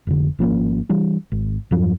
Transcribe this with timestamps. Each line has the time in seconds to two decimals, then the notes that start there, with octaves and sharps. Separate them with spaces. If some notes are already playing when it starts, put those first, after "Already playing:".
0.07 F1 D3
0.39 G#1 F3 A#3 C#4
0.89 E3 G3 D4
1.32 G#1
1.71 E2 G2 F3 F#3